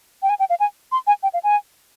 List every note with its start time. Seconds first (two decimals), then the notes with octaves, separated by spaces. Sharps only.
0.23 G5
0.29 G#5
0.40 G5
0.50 F5
0.60 G#5
0.92 C6
1.07 G#5
1.23 G5
1.34 F5
1.43 G#5